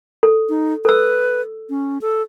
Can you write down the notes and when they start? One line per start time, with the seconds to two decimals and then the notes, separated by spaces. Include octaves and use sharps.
0.23 A4
0.49 D#4
0.85 A4 B4 E6
1.70 C#4
2.01 A4